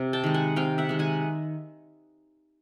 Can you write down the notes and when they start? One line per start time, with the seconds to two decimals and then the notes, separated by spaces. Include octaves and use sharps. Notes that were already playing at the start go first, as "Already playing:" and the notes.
Already playing: C3
0.13 G5 A5
0.24 D#3 G#3
0.34 F#5 G#5
0.56 C3 F5 G5
0.78 E5 F#5
0.89 D#3 G#3
0.99 F#5 G#5